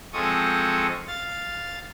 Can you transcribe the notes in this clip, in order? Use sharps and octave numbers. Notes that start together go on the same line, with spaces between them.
F3 G#3 C4 A4 C#6 D#6
F5 A6